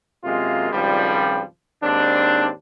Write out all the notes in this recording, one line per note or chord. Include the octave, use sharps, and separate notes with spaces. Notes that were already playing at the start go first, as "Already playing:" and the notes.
F#2 C3 G#3 A#3 F4
G#1 C#2 F3 G3
D#2 G#2 C4 D4